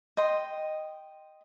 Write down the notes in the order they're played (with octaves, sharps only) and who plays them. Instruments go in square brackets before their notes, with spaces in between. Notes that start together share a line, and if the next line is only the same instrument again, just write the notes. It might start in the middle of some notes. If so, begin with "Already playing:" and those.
[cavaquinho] D#5 G5 C6